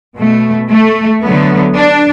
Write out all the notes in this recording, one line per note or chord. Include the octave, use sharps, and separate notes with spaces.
B2 A3
A3
D3 F#3 A3 B3
D4